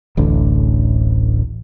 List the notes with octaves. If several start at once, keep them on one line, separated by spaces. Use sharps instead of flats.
D1 A1 D3